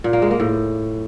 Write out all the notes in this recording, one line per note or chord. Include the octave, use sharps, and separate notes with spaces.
A#2
A#3
G#3
A#3
A2